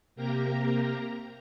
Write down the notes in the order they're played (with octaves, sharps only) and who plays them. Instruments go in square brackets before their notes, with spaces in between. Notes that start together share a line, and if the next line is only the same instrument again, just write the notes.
[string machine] C3 A#3 G4 A#4 A#5